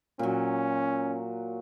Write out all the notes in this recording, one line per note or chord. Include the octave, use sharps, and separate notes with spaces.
A#2 F#3 C#4